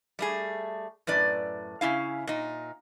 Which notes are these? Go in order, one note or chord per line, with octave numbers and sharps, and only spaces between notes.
G3 A3 G#4
F#2 A2 B4 D5
C#3 C#4 E4 F5
A#2 D#4